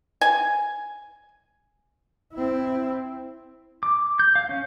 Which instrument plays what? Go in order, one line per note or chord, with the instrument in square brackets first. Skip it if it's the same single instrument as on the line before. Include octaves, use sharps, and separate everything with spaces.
[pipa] G#5
[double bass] C4 E4
[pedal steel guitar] D6
G6
F5
C#4